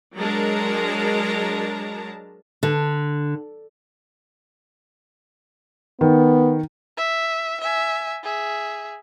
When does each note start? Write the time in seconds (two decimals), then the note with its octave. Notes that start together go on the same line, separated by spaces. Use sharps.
0.17 F#3 G#3 D4 A#4 A5 A#5
2.63 D3
6.01 D#3 B3
6.97 E5
7.61 E5 G#5
8.23 G#4 E5